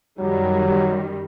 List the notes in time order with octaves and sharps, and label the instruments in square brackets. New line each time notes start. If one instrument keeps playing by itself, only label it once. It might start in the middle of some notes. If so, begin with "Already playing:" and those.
[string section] F#2 D#3 G3 [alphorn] F#3